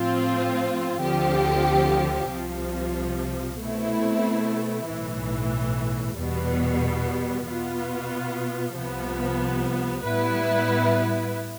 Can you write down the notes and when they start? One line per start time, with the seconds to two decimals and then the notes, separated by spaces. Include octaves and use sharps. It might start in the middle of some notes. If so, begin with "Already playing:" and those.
Already playing: A2 F3 C4 F4
1.00 D2 D3 F3 C4 G4
2.30 C2 C3 F3
3.59 B2 A3 C4 E4
4.88 B1 A2 E3
6.17 E2 B2 G3 B3
7.47 B2 B3 F4
8.76 C2 C3 F3 B3
10.05 A2 G3 B3 E4 B4